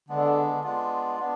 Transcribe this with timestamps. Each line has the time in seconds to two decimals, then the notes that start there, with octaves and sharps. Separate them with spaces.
0.09 D3 G#3 B3 D4
0.63 G#3 B3 D4 F4
1.20 B3 D4